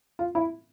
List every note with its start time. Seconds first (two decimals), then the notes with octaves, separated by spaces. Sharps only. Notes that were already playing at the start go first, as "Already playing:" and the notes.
0.19 F4
0.35 E4